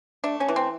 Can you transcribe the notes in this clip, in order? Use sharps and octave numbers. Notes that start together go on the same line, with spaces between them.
A3 D4
C#4
E3
C4